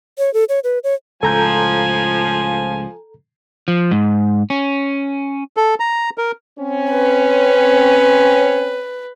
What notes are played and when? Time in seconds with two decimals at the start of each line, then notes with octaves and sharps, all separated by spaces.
0.18 C#5
0.34 A4
0.49 C#5
0.64 B4
0.84 C#5
1.23 C#2 A2 F3 A4 G#5 A#5 G6
3.68 F3
3.91 G#2
4.50 C#4
5.57 A4
5.80 A#5
6.18 A#4
6.59 C4 C#4
6.91 B4